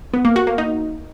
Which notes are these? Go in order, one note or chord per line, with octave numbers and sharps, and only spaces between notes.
B3
A#3
F#4
A#3
D#4